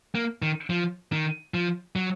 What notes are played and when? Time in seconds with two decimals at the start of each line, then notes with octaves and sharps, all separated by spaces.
0.15 A#3
0.42 D#3
0.70 F3
1.12 D#3
1.54 F3
1.96 F#3